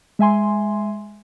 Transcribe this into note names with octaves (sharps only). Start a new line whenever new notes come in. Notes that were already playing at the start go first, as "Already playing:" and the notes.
G#3 E5 G#5 C6